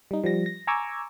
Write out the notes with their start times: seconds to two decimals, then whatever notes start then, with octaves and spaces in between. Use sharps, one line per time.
0.11 G3 D#4
0.24 F3 G3 A#6
0.46 A#6
0.67 G#5 A#5 C#6 D6 E6 G#6